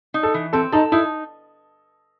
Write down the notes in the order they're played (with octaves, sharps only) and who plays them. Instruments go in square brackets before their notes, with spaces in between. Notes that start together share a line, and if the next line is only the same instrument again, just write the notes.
[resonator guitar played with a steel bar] D#4
[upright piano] A4
[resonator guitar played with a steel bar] E3
[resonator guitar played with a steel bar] C4 [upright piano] A4
[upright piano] D#4 [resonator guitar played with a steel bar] A4
[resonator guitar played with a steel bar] D#4 [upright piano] E4